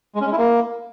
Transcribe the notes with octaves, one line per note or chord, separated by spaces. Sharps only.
G#3
C#4
G#3
E4
A#3